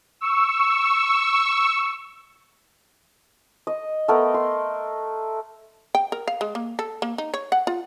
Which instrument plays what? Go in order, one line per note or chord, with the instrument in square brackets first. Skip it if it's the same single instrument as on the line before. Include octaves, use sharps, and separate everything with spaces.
[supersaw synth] C#6 E6
[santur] D#5
A3 B3 A#4
C6
[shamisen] G5
A#4
F5
G#3
A#3
A4
A#3
D#4
C#5
F#5
F4